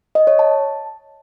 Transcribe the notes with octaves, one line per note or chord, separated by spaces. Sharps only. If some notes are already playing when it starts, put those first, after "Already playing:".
D#5
C#5
A5